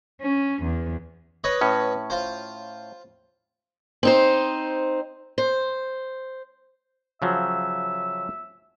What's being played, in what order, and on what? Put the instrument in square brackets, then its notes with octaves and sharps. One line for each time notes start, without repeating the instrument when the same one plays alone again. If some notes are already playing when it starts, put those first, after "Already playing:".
[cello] C#4
E2
[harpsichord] B4 C#5 D#5
[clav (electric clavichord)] A2 C#4
[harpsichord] F4 C5
[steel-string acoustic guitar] C4 D#4 C5
C5
[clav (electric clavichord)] C#3 F3 F#3 [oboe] E5